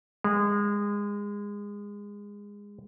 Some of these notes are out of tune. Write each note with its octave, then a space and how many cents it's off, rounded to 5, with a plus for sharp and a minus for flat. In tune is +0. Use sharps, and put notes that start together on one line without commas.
G#3 -25